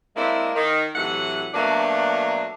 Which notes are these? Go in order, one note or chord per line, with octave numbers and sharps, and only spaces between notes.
G#3 A#3 C4 D4 E4
D#3
A2 C3 E3 F#3 E5 F#5
B2 F#3 A3 A#3 D4